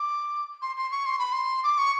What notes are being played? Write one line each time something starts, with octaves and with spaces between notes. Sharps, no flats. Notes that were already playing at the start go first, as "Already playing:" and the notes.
Already playing: D6
C6
C6
C#6
C6
B5
C6
D6
C#6